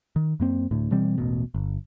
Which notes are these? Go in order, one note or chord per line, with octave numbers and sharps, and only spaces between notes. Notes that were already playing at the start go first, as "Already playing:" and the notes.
D#3
F#2 A#3 C4
D2 A2
B2 E3 G3 C4
E1 A1 B2
G1